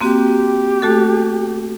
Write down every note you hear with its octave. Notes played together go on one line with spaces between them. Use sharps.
A#3 C4 F#4 G4
A3 F#4 A4